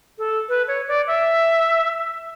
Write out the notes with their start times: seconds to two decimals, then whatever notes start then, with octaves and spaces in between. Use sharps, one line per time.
0.18 A4
0.49 B4
0.68 C#5
0.88 D5
1.07 E5